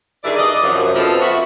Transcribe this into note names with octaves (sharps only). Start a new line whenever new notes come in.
G2 D#3 E4 G#4 D5
D5 D#5
F#2 C3 F3
F3 B3 C4 F4 A4 D#5
F#4 E5